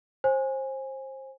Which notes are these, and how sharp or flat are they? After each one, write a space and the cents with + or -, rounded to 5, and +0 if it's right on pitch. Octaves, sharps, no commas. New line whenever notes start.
C5 +25 G#5 -10